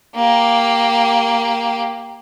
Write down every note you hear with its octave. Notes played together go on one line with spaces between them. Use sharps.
A#3 G4